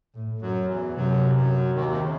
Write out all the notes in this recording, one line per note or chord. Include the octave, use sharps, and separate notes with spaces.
A2
F#2 F#3
E2 E3
F#2 C3 F#3
E3
F#2 F#3
D#2 D#3
C3
C#3